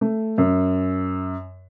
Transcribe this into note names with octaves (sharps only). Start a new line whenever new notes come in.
A3
F#2